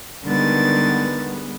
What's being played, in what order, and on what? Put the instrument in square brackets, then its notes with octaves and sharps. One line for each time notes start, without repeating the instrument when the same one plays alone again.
[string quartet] D3 D#3 A6 [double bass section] G3 G#3 B3